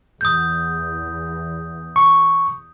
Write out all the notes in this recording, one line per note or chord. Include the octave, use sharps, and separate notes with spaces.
E2 D#6 G6
C#6